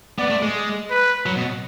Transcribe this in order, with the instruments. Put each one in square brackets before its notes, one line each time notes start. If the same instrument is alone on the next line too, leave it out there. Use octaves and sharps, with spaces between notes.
[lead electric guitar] B3 [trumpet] D5
[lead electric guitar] A3
G#3
[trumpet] B4
[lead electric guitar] F#3
B2